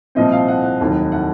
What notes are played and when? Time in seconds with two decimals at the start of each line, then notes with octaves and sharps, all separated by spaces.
0.15 C2 A#2 F3 C4 D#5
0.32 F5
0.48 F#5
0.63 F#5
0.79 F1 D#2 D#3 F#3
1.12 F#5